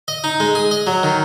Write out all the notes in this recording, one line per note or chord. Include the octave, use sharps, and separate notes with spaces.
D#5
D#4
G#3
G#4
D#5
F#3
D#3